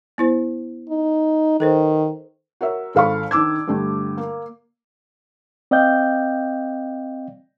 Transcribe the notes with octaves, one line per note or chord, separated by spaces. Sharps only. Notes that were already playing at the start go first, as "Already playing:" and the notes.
B3 E4 C5
D#4
D#3 A4 B4 C5
F#4 A#4 C#5 E5
G#1 A4 F5 B5 C#6
D#3 D4 D6 E6 G#6
G2 D3 G3 A3
A#3
C4 D5 D#5 F5 G5 G6